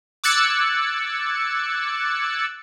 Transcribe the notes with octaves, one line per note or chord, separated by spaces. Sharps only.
D6 E6 F#6 G#6 A6 C#7